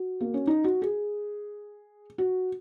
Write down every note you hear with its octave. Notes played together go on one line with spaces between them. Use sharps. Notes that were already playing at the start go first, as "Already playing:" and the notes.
Already playing: F#4
A#3
C#4
D#4
F#4
G#4
F#4